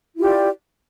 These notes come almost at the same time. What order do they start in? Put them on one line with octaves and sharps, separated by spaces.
E4 F4 G4 D5